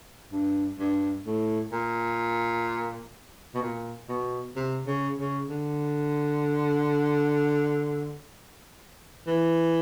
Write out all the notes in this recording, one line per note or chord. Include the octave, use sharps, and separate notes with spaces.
G2
G2
A2
A#2
B2
A#2
B2
C3
C#3
C#3
D3
E3